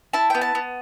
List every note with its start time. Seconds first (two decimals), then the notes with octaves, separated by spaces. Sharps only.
0.13 E4 A5
0.30 B3 G5
0.41 A5
0.55 B3